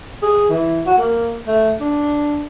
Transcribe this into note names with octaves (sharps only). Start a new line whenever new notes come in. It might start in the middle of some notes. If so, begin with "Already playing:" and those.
G#4
E3
F#4
A#3
A3
D4